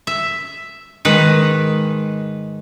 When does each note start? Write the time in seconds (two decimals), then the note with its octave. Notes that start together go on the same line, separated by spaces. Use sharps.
0.07 E5
1.05 G#2 D#3 G#3 B4